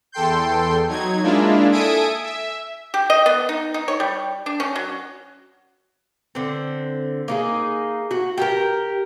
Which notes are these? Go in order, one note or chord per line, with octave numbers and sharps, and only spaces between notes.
E2 A4 G5 C6 G6
F#3 D#4 G#6
G#3 A#3 D4 E4 F4
A4 E5 G#5 D#6 D7
E5
G4
D#5
B3
D#4
D#4
C#5
G3
D4
C#4
F#3
D3 C4
A#3 D#4 G#4
F#4
G4 A4 A#4